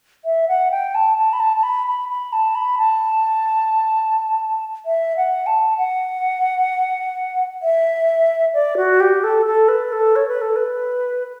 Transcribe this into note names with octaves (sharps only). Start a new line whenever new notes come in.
E5
F#5
G5
A5
A5
B5
A5
A5
B5
B5
B5
A5
B5
A5
E5
F#5
A5
F#5
E5
D5
F#4
G4
A4
A4
B4
A4
C#5
B4
A4
B4